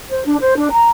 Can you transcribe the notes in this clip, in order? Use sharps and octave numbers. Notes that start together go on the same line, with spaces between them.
C5
D4
C5
D4
A#5